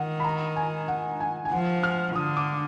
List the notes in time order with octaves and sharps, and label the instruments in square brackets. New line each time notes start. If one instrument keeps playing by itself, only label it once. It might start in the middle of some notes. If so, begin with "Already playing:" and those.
Already playing: [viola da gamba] D#3 [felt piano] F#5
[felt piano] B5
A#5
G#5
F#5
G#5
G#5
[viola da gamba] F3 [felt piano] F#5
[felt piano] F6
[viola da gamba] D3 [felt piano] D#6
[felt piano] D6